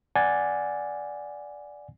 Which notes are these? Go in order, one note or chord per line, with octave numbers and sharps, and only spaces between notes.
D5 F#5 G#5 A6